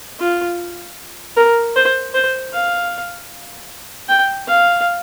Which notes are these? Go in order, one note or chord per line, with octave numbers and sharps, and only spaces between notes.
F4
A#4
C5
C5
F5
G5
F5